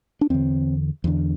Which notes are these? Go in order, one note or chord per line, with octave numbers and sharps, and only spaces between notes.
D4
E2 D3 C4
E2 D3